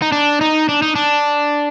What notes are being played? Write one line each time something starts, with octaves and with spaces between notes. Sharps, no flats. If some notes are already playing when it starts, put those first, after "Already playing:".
D#4
D4
D#4
D4
D#4
D4